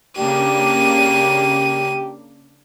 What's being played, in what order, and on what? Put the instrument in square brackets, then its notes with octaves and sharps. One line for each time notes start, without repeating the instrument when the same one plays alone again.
[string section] C#3 A#3 D4 [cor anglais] G4 [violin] D#7